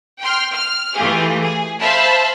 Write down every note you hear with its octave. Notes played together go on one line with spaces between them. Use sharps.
G5 C6 F6
F6
E3 A3 F4 G4 G#4
G#4
C5 E5 F5 A5 B5